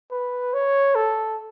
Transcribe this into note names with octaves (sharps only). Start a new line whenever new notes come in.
B4
C#5
A4